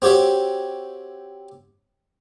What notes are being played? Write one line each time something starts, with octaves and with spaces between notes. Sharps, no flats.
C4 F#4 G4 C#5 E5